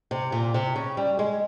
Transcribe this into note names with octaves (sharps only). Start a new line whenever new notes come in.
C3
A#2
C3
C#3
G3
G#3